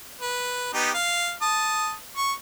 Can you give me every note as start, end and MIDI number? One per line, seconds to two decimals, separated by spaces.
0.21 0.69 71
0.74 0.91 59
0.74 0.91 63
0.74 0.91 67
0.94 1.33 77
1.42 1.94 81
1.42 1.94 87
2.17 2.33 85